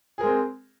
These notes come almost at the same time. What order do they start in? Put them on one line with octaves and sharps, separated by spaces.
G#4 A#4 G#3 C4